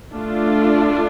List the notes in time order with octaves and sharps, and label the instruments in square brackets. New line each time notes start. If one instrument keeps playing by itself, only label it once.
[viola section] A3 D4 F4